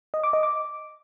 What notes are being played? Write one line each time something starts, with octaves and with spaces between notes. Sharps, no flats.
D#5
D6
D#5
D6